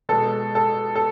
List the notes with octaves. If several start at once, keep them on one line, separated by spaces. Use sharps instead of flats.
B2 G#3 A4
A4
A4